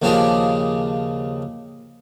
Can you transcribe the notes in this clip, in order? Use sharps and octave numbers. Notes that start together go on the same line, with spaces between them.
D#2 C#3 F3 D4 G4 G#4